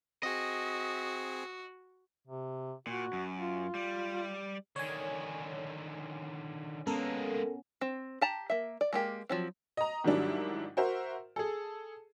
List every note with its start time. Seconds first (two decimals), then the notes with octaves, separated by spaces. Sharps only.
0.23 C4 F#4 G#4 D#5
2.27 C3
2.87 A#2 F#4
3.13 F#2
3.39 F4
3.75 G3
4.76 D3 D#3 C#5 G#5
6.87 G#3 A#3 B3 C#4 A4 A#4
7.81 C4
8.21 G4 A5 A#5
8.50 A#3 E5
8.81 D5
8.93 G#3 A#3 G4
9.29 F3 F#3 C4
9.77 D#5 A#5
10.04 G#2 D#3 F#3 G3 D4 E4
10.77 F#4 A#4 C5 E5
11.36 G#4 A4